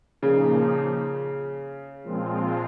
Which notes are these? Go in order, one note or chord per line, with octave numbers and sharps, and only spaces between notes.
A#2 C#3 F3 A#3 D#4
A#2 F3 G#3 C4 F4